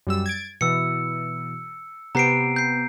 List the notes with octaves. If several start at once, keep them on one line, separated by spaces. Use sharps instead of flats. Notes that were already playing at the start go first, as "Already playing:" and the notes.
F#2 G3 E6
G#6 A6 D7
B2 E3 E6 C#7
C3 B3 G4 A#5 C7 D7
G6 C7